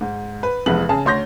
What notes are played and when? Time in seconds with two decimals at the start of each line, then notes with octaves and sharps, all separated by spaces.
0.01 G#2
0.43 B4
0.66 F1 F2 E3 G#3 B3 F#7
0.89 C#3 G#4 A5
1.05 D2 C#5 C6 G6 A#6